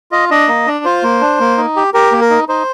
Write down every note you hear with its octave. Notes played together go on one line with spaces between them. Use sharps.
F4 D#5
D4 D#5
A#3
D4
F4 C5
A#3
D4
A#3
D#4
G4
G4 A#4
A#3
A#4
D#4
D#4 C5